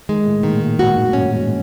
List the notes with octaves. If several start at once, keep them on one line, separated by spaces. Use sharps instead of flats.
D#3 G#3 D#4
A2 A3
A#2 D#3 A#3
A#2 A#3
G#2 G#3 F#4
F#2 F#3
G2 G3 C#4
G#2 G#3